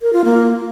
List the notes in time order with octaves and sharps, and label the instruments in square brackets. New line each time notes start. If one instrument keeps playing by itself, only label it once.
[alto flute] A#4
F4
A#3